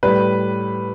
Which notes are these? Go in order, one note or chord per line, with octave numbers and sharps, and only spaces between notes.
A2 G3 B4